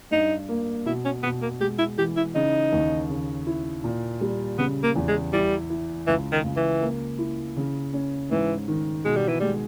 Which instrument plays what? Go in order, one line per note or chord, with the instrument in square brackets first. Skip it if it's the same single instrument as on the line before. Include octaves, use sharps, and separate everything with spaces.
[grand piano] G2 [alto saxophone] D#4
[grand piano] A#3
[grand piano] B2 [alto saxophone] E4
[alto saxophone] C#4
[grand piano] B2 [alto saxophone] B3
[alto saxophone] A#3
[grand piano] G#3 [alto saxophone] G4
[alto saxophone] E4
[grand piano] E3 [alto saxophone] G4
[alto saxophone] E4
[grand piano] C#3 [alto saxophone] D#4
[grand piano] D#2
C#3
E4
A#2
G3
[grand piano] C#3 [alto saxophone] B3
[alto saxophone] A#3
[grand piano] E2
[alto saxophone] G#3
[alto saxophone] G3 [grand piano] E4
[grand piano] E4
[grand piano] C#2 [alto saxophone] E3
[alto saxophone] D#3
[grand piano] C#2
[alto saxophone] E3
[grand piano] A#3
E4
C#3
C#4
[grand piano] G#2 [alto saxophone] E3
[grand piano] D#3
[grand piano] B2 [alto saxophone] G#3
[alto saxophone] G3
E3
[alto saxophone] G3 [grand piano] G#3